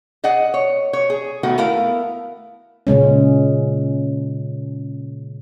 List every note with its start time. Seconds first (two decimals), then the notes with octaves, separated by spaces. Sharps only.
0.24 G#4 D5 D#5 F#5
0.54 C#5
0.93 C#5
1.10 G#4
1.43 D#3 A3 B3 F#4
1.58 A3 B3 E4 A#4 F5
2.87 A#2 C#3 G#3 C#4